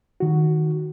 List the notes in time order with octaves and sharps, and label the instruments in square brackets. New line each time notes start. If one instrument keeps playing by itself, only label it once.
[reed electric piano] D#3 F#4